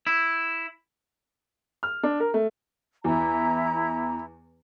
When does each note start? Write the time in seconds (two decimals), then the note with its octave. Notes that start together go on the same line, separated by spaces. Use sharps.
0.07 E4
1.83 F6
2.03 D4
2.20 A#4
2.34 A3
3.04 E2 E4 A#5